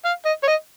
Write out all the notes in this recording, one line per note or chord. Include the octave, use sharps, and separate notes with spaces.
F5
D#5
C#5
D#5